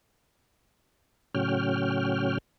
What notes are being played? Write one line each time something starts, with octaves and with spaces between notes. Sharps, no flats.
A2 C#3 F#3 C#4 G5 F6